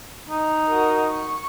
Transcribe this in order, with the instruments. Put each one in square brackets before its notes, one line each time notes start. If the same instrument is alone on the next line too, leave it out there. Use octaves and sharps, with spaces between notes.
[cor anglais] D#4
[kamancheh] F#4 A#4
C#6